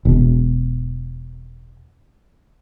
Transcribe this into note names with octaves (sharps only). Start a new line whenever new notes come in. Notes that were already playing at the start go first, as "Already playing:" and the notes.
E1 B2